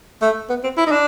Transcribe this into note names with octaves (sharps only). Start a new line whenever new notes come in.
A3
B3
C4
E4
D#4
D4